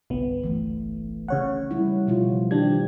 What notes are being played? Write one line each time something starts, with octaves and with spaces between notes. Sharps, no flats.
G1 C2 B3
E3 A3
C#3 C#5 F#5
G3 E4
B2 F3 F4
D#3 D4 G4 G#6